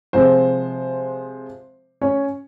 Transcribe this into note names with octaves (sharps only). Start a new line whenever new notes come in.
C3 F3 G#3 C5
C#4 C#5